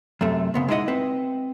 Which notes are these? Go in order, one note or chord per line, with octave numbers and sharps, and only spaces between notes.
F#2 C3 A3
C#3 B3 C4
G#3 D#4 E4 D5 D#5 F#5
C4 B4